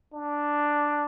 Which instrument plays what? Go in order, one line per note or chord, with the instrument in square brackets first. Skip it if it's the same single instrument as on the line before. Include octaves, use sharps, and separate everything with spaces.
[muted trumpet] D4